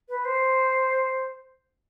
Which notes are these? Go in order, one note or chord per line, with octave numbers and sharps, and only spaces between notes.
B4
C5